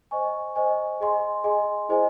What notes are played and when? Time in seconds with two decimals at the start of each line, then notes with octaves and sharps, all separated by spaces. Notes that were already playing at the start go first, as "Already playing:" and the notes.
0.11 C5 D#5 G#5 C#6
0.56 C5 D#5 G#5 C#6
1.00 G#4 D#5 G#5 C6
1.44 G#4 D#5 G#5 C6
1.89 E4 G#4 C5 D#5 G#5